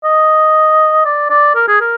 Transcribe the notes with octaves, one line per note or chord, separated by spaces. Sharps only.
D#5
D5
D5
A#4
G#4
A#4